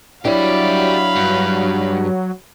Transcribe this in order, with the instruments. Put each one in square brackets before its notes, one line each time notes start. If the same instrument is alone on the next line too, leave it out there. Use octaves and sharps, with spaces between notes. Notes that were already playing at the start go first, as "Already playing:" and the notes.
[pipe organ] F#3 [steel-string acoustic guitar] D4 E4 C#5 [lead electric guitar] G4 D5 [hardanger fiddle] F5 B5
[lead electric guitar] G2